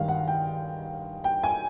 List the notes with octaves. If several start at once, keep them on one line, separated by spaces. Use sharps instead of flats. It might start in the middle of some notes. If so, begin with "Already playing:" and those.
Already playing: G2 D#3 G#3 F5
F#5
G5
G5
G#5